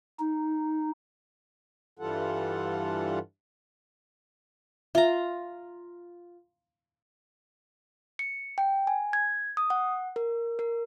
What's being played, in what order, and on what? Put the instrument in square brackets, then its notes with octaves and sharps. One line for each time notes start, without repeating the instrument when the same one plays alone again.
[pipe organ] D#4
[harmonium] G2 E3 G3 F4 A4 F#5
[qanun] F4 A#5 [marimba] E5
[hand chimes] C#7
G5
G#5
G#6
D#6
F#5
A#4
A#4